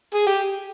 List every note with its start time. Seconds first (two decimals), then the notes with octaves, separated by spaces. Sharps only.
0.15 G#4
0.26 G4